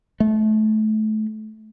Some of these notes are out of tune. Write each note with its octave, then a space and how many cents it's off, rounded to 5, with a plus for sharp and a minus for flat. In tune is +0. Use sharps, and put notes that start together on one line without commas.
A3 -25